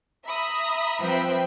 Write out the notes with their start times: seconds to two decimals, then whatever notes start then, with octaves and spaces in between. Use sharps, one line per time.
0.25 E5 A#5 B5 D#6
1.02 F3 C4 B4 E5 G5